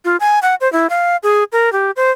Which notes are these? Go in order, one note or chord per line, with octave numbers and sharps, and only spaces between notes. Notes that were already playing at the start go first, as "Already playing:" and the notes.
F4
G#5
F#5
C5
E4
F5
G#4
A#4
G4
C5